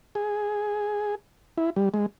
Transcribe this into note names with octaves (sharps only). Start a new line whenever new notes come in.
G#4
E4
G3
G#3